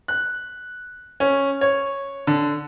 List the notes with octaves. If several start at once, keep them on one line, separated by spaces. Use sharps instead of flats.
F#6
C#4
C#5
D3